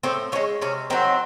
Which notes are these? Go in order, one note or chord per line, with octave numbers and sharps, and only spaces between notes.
A2 C4
F3 G#3 C#4
C3 C#4
D#3 F#3 C4